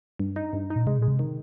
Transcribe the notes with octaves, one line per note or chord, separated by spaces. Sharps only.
G2
D#4
G2
D#4
A#2
C3 G#3
A#2 G#3
C3
D#3